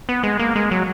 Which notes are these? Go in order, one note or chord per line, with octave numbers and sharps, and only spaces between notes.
B3
G#3
A#3
G#3
F#3